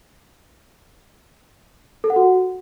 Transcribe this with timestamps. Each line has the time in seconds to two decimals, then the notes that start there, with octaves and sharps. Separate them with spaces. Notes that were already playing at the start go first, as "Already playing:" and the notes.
2.04 A4
2.10 F#5
2.16 F#4